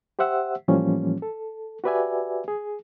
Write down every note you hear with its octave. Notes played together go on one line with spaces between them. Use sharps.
G4 C5 E5 F#5 E6
A2 E3 F3 G3 A#3 C#4
A4
F#4 G4 B4 D5 E5 G#5
G#4